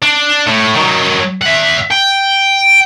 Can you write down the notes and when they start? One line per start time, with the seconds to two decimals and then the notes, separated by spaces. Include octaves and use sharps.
0.02 D4
0.46 A2
0.76 D#3 F#3
1.41 E5 F#5
1.91 G5